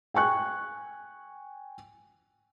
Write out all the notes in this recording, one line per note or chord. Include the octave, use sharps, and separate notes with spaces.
G5 G#5 C#6 F#6